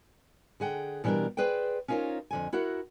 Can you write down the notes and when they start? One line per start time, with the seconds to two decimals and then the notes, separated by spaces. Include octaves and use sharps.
0.60 D3 G#4 F#5 G5
1.04 B2 E3 G3 D4 G4 A#4
1.37 G#4 B4 C5 D5 G5
1.88 C#4 D#4 F4 A#4 C5 C#5
2.31 F2 D3 G#5
2.53 E4 F#4 A#4 E5 F#5